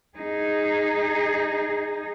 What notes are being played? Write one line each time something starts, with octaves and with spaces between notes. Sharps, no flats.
D#4 G#4